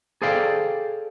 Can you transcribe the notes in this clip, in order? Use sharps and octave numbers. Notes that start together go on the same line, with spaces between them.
G#4 A4 C5 D5 F5 G5